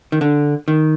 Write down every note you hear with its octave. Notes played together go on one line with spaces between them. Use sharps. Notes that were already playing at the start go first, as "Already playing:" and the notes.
D#3
D3
D#3